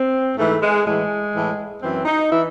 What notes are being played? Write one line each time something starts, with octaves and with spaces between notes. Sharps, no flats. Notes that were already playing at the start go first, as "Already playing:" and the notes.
Already playing: C4
G#2 E3 A3
G#3
A2 E3 G#3
A2 E3
F#2 E3 C4
D#4
E3 E4